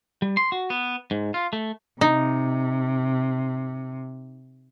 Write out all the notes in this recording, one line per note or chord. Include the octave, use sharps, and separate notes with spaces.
G3
C6
F#4
B3
G#2
F4
A3
C3 D#4